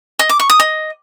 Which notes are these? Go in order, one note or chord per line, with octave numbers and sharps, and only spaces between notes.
D#5
D6
C#6
D#6
D#5